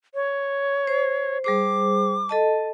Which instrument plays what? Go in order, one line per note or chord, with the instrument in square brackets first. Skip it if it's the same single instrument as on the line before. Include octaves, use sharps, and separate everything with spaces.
[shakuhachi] C#5
[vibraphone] C5
[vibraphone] G3 G#4 C5 [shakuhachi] D6
[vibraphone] A4 D#5 A5